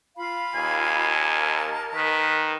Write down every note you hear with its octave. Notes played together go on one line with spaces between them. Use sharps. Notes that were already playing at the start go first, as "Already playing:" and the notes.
F4 F5 B5
D#2 G#5
A#4 A5
D#3 B4